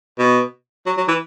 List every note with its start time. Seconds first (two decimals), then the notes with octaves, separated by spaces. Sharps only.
0.19 B2
0.86 F#3
0.97 F#3
1.08 E3